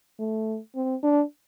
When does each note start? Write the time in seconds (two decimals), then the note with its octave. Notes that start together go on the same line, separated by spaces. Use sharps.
0.19 A3
0.75 C4
1.03 D4